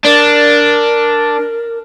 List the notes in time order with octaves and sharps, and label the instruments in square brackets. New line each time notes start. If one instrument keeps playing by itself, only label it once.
[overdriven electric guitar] D4 [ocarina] A#4